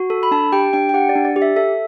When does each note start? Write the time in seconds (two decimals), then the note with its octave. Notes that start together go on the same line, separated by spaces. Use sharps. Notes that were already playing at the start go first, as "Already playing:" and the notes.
Already playing: F#4
0.10 A4
0.23 B5
0.31 D4 A5
0.53 G4 G5
0.73 D4 G5
0.89 G5
0.94 G4 F#5
1.09 D5
1.15 D4
1.25 D5
1.36 G4
1.42 E5
1.56 A4 E5